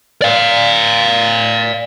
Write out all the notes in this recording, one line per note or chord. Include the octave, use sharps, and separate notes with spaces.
D5 F5